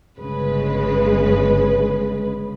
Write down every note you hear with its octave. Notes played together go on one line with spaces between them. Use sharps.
G1 C#3 G#3 B4